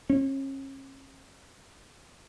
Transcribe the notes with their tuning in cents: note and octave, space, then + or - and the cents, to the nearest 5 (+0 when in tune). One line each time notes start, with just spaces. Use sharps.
C#4 -35